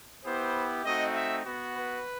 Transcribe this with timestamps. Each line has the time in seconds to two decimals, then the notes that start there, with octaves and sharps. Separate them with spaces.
0.24 B3 E4 G4 C5
0.84 A3 C4 D#4 F#4 D#5
1.14 E5
1.45 B3 F#4
1.75 B4